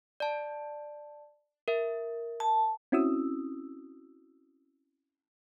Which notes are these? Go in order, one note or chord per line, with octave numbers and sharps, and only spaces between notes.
D5 A5
A#4 E5
A5
C4 C#4 E4 F#4 D#6 E6